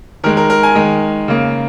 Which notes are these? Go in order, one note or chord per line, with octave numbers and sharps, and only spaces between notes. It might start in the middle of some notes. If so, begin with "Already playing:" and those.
D#3 G#3 A#4
A#4
A#4
G#5
D#3 G#3
C#3 A#3